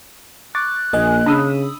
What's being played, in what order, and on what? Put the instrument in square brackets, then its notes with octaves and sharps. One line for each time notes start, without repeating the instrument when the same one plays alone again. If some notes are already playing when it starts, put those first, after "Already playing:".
[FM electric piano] C#6 D6 A6 [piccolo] F#6
[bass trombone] A#1 [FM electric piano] A#3 D#5 G#5
[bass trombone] C#3 [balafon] D4 [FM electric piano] B5 D#6 E6